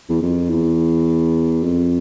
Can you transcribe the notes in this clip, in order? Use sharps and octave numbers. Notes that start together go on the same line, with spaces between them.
E2
F2
E2
F2